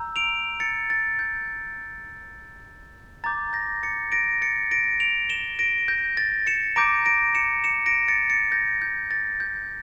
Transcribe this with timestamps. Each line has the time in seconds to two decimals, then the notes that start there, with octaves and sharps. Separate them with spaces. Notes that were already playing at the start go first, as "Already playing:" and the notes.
Already playing: A#5 E6 G6
0.16 D7 F7
0.60 A6 C#7
0.90 A6
1.19 G6
3.24 A#5 D6 G6 A6
3.53 G6 A#6
3.83 A6 C#7
4.12 A#6 D7
4.42 A6 C#7
4.71 A#6 D7
5.00 D7 F7
5.29 E7 G7
5.59 A#6 D7
5.88 G6 A#6
6.17 A6
6.47 C#7 E7
6.76 A#5 D6 G6 A#6 D7
7.05 A#6 D7
7.35 C#7 E7
7.64 C#7 E7
7.86 A#6 D7
8.08 A6 C#7
8.30 A6 C#7
8.52 G6 A#6
8.82 G6
9.11 A6
9.40 G6